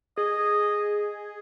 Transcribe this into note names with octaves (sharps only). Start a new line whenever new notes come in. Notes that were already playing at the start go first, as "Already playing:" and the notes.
G#4 D#5